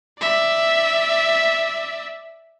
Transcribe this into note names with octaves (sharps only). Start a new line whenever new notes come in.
D5 E5